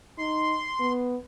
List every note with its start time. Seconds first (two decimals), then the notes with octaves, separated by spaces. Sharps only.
0.18 D#4 C6
0.80 B3